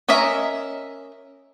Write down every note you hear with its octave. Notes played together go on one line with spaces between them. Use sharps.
C#4 A#4 D#5 E5 A#5